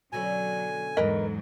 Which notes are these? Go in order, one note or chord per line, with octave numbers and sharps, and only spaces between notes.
B2 D3 F#3 C#4 G#5
E2 G#2 F#3 A#4 B4 D#5